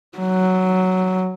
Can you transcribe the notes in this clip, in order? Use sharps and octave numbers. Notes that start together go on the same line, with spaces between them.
F#3